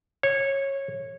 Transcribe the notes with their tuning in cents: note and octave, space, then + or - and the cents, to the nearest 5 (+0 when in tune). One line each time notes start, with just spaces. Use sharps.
C#5 -15